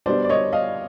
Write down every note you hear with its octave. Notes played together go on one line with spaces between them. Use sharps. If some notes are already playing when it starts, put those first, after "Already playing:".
B2 G3 B3 D4 C5 D5
D5
C#5 D#5
D#5 F5